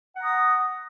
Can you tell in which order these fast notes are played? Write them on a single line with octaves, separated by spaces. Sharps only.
F#5 A#5 D#6